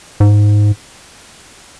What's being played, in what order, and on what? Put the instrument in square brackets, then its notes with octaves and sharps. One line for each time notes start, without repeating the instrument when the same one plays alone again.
[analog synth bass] G#2